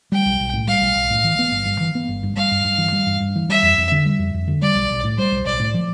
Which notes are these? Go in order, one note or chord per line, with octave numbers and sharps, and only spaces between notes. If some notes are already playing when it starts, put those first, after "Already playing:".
G3 G5
B1
B1
A2
G3 F5
B1
B1
A2
E3
B3
G1
G2
E3
B3
G1
G2
G3 F5
G2
G2
E3
G3
G2
G2
E3
G3 E5
F2
F2
D3
G3
F2
F2
D3
G3 D5
B1
B1
A2
G3 C5
B1
B1 D5
A2
F3